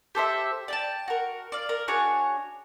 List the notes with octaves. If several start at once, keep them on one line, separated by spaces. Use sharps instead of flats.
G4 A4 C5 E5
D5 G5 A5
F#4 A#4
D5 F5
A#4
D4 F#4 G#4 C#5